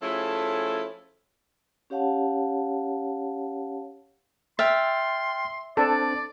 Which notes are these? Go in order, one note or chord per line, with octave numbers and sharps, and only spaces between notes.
F3 A3 C#4 E4 G#4 A4
C#4 G4 C#5 F5 F#5 A5
E5 G5 C6 F6 A6
C4 D4 A4 C5 D5